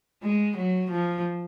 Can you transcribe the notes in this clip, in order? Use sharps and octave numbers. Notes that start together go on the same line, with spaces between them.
G#3
F#3
F3